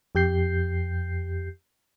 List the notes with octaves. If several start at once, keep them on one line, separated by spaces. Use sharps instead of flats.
F2 G4 G6 C7